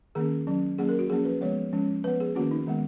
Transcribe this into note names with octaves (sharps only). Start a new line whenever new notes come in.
D#3 A#3 C#4 G#4
F#3 C#4
F#3 A#3 C#4 G#4
A#4
F#4
F3 A#3 C#4 G#4
B4
F3 G#3 B3 C#5
F3 G#3 C#4
F3 B3 B4
G#4
D#3 A#3 C#4 F#4
D#4
D#3 G#3 B3